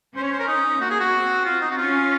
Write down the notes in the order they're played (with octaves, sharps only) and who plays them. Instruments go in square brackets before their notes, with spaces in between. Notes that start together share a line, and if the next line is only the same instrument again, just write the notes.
[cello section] C#4 [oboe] C5
[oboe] C#5
C5
A#4
D#4
[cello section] A#3 [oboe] F#4
[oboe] G#4
F#4
[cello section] C4
[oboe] F4
D#4
F#4
[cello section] C#4 [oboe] F4